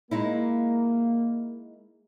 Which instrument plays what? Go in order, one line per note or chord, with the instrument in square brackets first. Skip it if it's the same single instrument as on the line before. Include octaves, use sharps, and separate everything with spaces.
[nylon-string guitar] G#3 D#4 E4 [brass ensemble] A#3